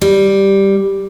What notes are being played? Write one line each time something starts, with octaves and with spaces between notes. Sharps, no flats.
G3